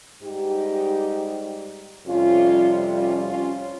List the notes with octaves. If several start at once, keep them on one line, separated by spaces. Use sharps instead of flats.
G#2 G3 D#4 G4
F2 C3 G3 C#4 F4
C#4 F4
C#4 F4